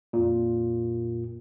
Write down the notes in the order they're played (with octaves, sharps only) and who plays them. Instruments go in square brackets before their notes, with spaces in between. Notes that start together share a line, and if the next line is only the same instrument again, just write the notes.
[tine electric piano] F2 A#2